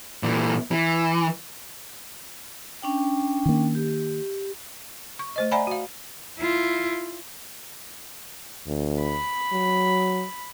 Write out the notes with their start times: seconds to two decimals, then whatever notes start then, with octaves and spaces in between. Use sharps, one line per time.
0.23 A#2 E3
0.71 E3
2.82 C#4 D4 G5
3.46 D#3 A#3
3.75 G4
5.19 C#6
5.36 A3 C5 D#5
5.51 D5 E5 F#5 G#5 A#5 B5
5.67 F#4 F5
6.38 E4 F4
8.67 D2
9.02 B5
9.52 F#3